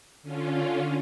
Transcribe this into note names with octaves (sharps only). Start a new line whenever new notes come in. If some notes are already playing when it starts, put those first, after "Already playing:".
D3 C#4 F4